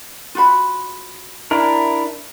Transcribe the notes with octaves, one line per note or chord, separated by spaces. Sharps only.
F4 F#4 B5
D4 E4 A#4